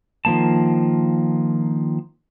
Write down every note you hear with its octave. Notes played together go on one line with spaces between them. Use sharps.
D#3 F3 A#3 A5